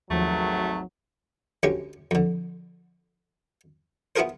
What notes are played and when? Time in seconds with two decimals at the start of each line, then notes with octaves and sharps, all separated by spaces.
0.11 G#1 D#2 F3 F#3 A3
1.63 D2 G#3 C#4 G4
2.11 F2 D3
4.16 B3 E4 F4 G#4 A#4 C5